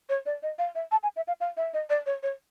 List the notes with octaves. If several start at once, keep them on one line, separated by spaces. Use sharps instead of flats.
C#5
D5
D#5
F5
E5
A5
G#5
E5
F5
F5
E5
D#5
D5
C#5
C#5